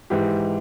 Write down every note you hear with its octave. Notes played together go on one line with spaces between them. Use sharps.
G#2 E3 G4